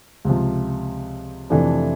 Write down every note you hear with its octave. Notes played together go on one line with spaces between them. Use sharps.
C#2 C3 F3
F2 C3 E3 A3 D4